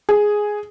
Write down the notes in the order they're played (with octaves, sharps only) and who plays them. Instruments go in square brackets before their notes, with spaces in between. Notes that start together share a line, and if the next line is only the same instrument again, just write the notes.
[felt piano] G#4